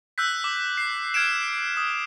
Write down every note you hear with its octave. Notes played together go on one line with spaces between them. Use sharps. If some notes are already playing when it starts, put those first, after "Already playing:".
E6 F#6 G6 B6
D6
C7
F6 G#6 C7 D7 E7
D#6